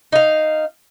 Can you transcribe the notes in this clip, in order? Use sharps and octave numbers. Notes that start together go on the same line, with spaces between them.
D#4 F5